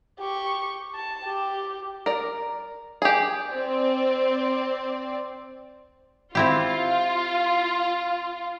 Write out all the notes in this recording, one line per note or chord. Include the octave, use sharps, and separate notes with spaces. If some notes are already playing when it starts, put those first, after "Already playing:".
G4 C#6
A5
G4
A#4 D5
G4 G#4
C4 D5
C4 E4 F4 G4